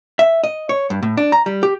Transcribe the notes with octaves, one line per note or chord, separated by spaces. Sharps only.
E5
D#5
C#5
G2
A2
D4
A#5
G3
G4